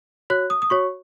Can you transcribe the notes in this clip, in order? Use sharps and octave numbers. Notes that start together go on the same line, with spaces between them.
F#4 C#5 F#6
D#6
D#6
F#4 C#5 C#6